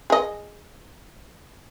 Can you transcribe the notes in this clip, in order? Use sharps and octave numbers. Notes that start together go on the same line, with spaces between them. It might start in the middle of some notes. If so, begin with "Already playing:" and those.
G#4 D#5